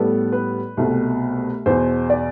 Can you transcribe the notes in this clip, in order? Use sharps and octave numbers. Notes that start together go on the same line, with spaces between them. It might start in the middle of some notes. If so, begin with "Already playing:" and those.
Already playing: A2 G3 B3 A4
B4
C2 B2 A3
E2 B2 B3 C5
D5